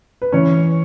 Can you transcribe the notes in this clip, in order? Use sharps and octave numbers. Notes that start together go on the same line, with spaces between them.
B4
E3 C#4 C#5